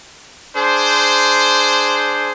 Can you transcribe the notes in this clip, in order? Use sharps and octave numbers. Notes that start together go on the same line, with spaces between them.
D4 G#4 C5